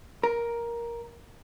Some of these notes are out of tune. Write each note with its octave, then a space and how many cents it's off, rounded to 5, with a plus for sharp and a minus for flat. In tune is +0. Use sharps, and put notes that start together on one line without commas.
A#4 +10